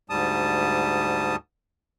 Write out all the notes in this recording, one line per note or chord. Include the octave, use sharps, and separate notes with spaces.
D2 G#2 G3 A5 D#6